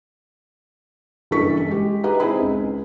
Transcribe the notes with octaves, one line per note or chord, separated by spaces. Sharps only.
F#1 G2 E3 A4 C#6 B6
G#3 G4
D#4 G4 G#4 B4 D#5 A#5
C4 D#4 E4 G#4 B5
C#2